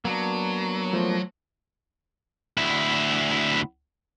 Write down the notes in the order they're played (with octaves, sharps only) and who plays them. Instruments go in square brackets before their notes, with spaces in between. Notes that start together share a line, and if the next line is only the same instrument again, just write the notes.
[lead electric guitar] F#3 [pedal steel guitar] A#3 B3 D4
[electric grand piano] F3 A3 C5
[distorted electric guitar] D2 E4